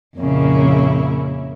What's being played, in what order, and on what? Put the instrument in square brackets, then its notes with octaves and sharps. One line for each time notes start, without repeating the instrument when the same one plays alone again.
[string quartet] F2 A#2 C#3 A#3 C#4 E4